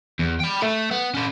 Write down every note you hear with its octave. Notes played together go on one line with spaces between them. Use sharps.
E2
G5 B5
A4 E5
B3
C#4 A4